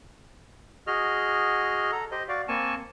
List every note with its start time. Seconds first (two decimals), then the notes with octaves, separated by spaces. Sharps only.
0.87 F#4 G#4 D#5 F6
1.92 A4 A#5
2.12 G4 C5 D#5
2.29 F#4 D5 F5
2.48 A#3 C4 G#5 A5 C#6